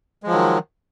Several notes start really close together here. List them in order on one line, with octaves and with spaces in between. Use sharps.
G#3 F3 F#3 D#3